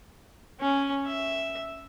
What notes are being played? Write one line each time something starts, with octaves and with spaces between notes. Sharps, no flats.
C#4
E5